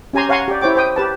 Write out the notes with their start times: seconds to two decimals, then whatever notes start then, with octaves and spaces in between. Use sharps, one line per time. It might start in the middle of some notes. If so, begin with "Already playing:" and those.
0.13 C#4 G4 G#5 A#5 C6
0.29 C#5 F5 F#5 G#5 A#5 C6
0.48 G4 D5
0.61 E4 C5 C#5 G5 D6
0.75 C5 G5 D#6
0.96 G4 B4 A5